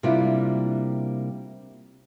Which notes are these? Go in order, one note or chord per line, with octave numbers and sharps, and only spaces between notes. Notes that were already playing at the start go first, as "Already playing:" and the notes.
C3 G3 A#3 D4 E4 F4